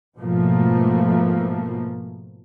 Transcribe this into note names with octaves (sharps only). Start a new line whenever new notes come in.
G#2 B2 F3 A3 A#3